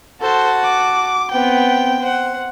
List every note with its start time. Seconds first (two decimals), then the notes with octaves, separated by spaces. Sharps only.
0.22 F#4 A4 C5 A5
0.64 D6
1.32 B3 C4 G5
2.00 C5 F#5